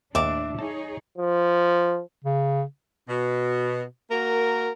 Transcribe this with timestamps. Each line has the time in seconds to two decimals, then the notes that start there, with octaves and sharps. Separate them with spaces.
0.15 D#2 A2 D4 D5 E5 A#5 D6
0.59 D#4 G#4 C#5 A5
1.18 F3
2.24 C#3
3.08 B2
4.10 A#3 F#4 A#4